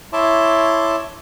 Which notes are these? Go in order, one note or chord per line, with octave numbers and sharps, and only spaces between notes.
E4 C#5 E5 A5 C6 D6